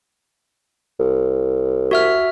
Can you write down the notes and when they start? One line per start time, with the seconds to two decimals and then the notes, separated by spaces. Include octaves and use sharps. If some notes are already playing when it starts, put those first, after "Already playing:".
1.00 C2
1.91 F#4 E5 F6